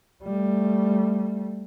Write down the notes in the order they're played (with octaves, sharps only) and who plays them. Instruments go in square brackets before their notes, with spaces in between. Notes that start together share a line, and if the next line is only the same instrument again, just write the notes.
[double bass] G3 A3